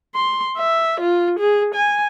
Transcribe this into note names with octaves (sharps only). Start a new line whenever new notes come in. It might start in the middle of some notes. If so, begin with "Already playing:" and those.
C6
E5
F4
G#4
G#5